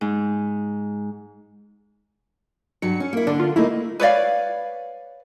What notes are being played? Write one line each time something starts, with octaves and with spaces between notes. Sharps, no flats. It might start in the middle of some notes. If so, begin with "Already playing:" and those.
G#2
G2 F#3 C#7
C#4
A#3 E4
D3 D4
F4
A3 A#3 D#4 E4
B4 C#5 D5 F5